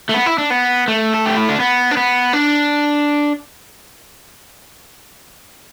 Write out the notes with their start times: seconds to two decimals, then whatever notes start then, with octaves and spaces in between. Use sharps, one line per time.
0.09 A3
0.14 B3
0.26 E4
0.38 D4
0.50 B3
0.88 A3
1.14 A4
1.26 G4
1.37 E4
1.49 D4
1.60 B3
1.91 D4
1.97 B3
2.33 D4